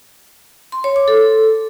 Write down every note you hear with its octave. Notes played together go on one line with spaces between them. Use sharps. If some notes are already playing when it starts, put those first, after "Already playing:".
C6
C#5
D6
A4